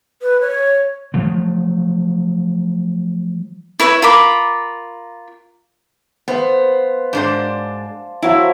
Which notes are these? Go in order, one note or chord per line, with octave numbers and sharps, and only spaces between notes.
B4
C#5
F3 F#3 A3
E4 B4 C#5 E5
F4 A#4 B5 D6
B3 C5 F5
G#2 D4 C5 D5 A5
F3 F#3 E4 A#5